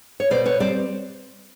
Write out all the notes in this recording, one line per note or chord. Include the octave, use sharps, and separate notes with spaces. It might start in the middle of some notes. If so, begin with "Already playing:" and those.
C#5
B2 C5 D5
B4 C#5
G3 C4 C5 D5